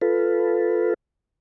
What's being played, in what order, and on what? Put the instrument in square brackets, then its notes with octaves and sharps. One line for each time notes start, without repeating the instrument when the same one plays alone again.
[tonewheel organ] F4 A4 B4